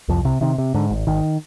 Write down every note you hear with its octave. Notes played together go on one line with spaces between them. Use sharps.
C2 F2 F3
C3
C3 D#3
C3
G#2 D3
G#1
G#1 D#3